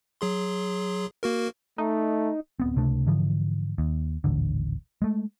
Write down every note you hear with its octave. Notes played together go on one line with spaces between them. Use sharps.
F#3 G#4 C6
A#3 F#4 A#4
A3 D#4
D1 B3 C4
C#2 C3 A3 D4
G#2 D3 E3 F3
D#2
D#1 A1 D3
G#3 A3